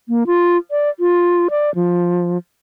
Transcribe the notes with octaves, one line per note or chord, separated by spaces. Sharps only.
A#3
F4
D5
F4
D5
F3